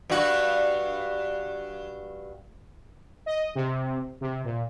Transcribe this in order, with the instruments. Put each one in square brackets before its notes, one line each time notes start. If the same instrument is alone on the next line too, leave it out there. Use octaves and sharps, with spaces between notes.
[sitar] G2 F#4
[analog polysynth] D#5
C3
C3
A#2